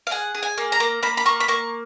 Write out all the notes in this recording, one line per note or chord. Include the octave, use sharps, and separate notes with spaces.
F5
G#4 F#5
G#4
G#5
A#3
A#5
A#3
A#3 B5
B5
A#3 C#6
B5
A#3 C#6